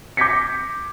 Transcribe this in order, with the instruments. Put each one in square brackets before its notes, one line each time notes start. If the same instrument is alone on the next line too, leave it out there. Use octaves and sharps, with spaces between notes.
[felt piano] D6 G6 G#6 A#6 B6 C#7